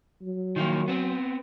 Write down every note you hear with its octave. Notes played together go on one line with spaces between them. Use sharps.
F#3
D#3 F3 A#3
B3 C4